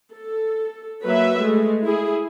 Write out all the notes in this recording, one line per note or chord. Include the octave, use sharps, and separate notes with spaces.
A4
F#3 A#3 B4 E5
G#3 A3
E4 G#4